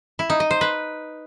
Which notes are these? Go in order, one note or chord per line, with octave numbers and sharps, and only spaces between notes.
E4
D#4
D#5
C5
B4